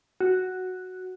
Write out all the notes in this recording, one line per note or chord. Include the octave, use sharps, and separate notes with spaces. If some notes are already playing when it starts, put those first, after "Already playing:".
F#4